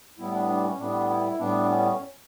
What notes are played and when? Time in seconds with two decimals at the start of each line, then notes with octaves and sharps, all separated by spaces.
0.18 A2 G3 B3 E4
0.34 D4
0.49 D4
0.64 C#4
0.79 A2 G3 B3 D4
1.10 E4
1.39 A2 G3 B3 D4
1.70 C#4